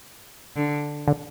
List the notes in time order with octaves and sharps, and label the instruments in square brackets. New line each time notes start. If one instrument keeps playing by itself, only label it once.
[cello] D3
[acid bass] D3